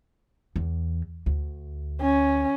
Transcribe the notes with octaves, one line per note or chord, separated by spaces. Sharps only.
E2
D2
C#4